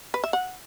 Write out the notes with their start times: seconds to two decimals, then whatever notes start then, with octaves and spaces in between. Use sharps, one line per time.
0.14 B4
0.24 E5
0.33 F#5